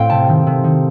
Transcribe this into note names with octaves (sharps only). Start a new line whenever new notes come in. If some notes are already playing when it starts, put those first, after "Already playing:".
Already playing: A2 A3 C4 F5 G5
C3 A5
D#3
C3
D#3